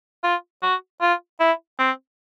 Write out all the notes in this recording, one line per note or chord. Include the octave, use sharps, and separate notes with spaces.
F4
F#4
F4
E4
C4